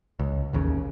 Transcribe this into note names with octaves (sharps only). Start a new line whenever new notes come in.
C#2
A1 D#2 C#3